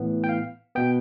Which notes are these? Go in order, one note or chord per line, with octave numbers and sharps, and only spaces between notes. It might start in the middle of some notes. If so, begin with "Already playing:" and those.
Already playing: A2 E3 B3
G5
F5
B2 B3 G5